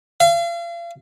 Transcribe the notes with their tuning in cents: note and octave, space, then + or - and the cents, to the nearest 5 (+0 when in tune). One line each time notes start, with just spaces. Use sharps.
F5 -40